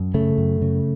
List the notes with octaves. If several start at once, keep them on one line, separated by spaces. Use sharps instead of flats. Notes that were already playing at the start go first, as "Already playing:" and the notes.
Already playing: F#2
C#3 A3
F#2
C#3